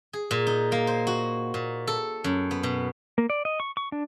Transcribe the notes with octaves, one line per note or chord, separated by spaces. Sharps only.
G#4
A#2
D#4
A#3
C5
F#4
A#2
A4
F#2
B3
B2
A#3
D5
D#5
C#6
C#6
D4